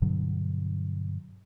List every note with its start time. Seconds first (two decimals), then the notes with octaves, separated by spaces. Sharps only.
0.02 G2 B2 D3 F#3